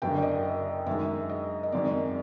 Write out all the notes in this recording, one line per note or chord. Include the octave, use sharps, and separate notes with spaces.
F#1 F#2 D3 G5
D5
D#5
E5
F#2 D#3 G#3 E5
D#5
D#5
F#2 D#3 G#3 C4 D5